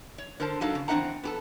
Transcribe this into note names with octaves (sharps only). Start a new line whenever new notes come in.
C#5
D3 A#4 C5 A5
F#3 D4 D#4 A4 F5
C#3
E2 C4 D4 D#5 F#5 A#5
B3 G4 A4